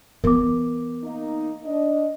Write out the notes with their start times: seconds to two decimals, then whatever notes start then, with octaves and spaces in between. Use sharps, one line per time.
0.24 E3 B3 A#4 D6
1.04 A#3 D#4
1.65 D4 D#5